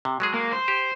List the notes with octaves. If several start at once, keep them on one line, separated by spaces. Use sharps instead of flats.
C3
F#3 G#3 G#4
A#3
C5
G4